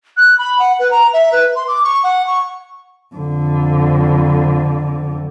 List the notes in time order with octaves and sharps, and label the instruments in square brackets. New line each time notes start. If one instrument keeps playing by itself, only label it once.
[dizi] F#6
B5
F#5
B4
A#5
E5
B4
C6
D6
C#6
F#5
C#6
[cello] F2 D3